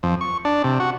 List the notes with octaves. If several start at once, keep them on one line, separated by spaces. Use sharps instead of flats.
F2
C#6
D4
C3
F#4